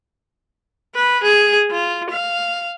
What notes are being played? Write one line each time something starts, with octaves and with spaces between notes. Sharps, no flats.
B4
G#4
F4
F5